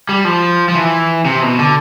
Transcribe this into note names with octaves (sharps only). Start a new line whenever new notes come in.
G3
F3
F3
E3
C3
B2
D3